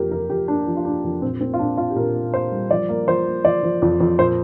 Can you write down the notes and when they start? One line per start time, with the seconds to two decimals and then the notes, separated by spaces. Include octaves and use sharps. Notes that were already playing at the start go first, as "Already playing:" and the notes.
Already playing: F2 A#3 G4 A#4
0.11 F2 A#4
0.30 F2 G4
0.48 A#3 D4
0.67 F3
0.77 F4
0.85 A#3 D4
1.04 F2
1.22 A#2 C4
1.41 A#3 C4
1.54 F4
1.59 A#2 D4
1.77 A#2 F4
1.90 G4
1.96 A#2 A#4
2.15 A#3
2.34 A#3 C5
2.52 G3
2.71 F3 D5
2.89 A#3
3.08 F3 C5
3.26 A#3
3.45 F3 D5
3.63 F3
3.82 F2
4.00 F2
4.19 A#2 C5